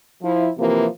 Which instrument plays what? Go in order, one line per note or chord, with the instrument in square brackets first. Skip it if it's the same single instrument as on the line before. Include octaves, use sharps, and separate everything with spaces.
[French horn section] F3 E4
C3 E3 F3 A#3